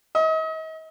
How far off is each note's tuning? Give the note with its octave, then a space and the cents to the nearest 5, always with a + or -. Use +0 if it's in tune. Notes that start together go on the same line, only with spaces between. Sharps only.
D#5 +40